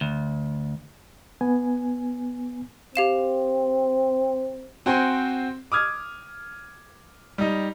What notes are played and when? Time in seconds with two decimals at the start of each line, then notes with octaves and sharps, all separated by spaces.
0.01 D2
1.41 B3 G#5
2.95 C4 G4 F5 E7
4.86 C4 F#4 C5 G5 G#5 C6
5.72 D6 D#6 F6 G#6
7.38 G3 D#4